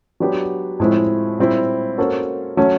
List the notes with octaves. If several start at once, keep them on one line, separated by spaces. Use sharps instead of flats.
F#3 B3 D4 G4
A2 F3 G#3 C4 E4
A#2 G3 C4 E4
A#3 C#4 F#4 A4 C5
F#3 A3 C#4